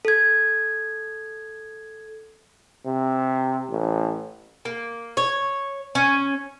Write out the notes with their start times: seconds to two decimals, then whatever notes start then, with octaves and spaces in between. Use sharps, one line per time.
0.05 A4 G#6
2.85 C3
3.69 A1
4.65 A#3
5.17 C#5
5.95 C#4